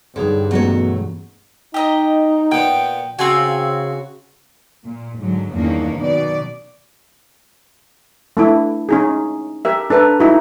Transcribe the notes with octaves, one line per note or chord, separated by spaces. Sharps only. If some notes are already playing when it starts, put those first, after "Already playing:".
G2 D3 D#4 G#4 C#5
B2 E3 F#3 A3 A#3 C#4 C#5
D#4 G4 D#5 A#5
A#2 B3 G5
C#3 C4 F4 F#4 G#5
A#2
G#2 D3 F#3
E2 G2 D#3 A#3 C#4 D4
F#2 B2 D#3 D5
A3 D4 E4
C#4 D#4 G#4
G4 A#4 E5
D4 A4 B4 E5 A#5
D#4 E4 F#4